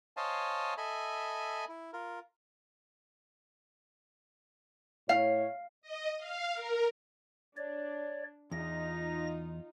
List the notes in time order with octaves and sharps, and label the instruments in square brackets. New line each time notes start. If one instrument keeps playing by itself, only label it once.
[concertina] C5 C#5 D#5 F5 G#5 A5
A4 D#5 E5 G#5 B5
E4
F4 A#4
[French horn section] A2 E4 C#5 [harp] F5
[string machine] D#5
F5
A#4
[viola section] D4 [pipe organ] C#5 D5
[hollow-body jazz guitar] E2 [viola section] D#4 F4 [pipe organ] A#6